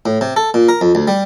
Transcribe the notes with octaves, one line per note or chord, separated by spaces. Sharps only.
A2
C3
A4
A#2
A#4
F2
D2
G3